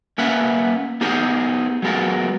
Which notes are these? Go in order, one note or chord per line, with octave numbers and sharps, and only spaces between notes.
A#3 C#4 A#4 B4 E5 F#5
B3 D#4 G4 G#4 A#4 C5
F#3 G#3 B3 F4 A#4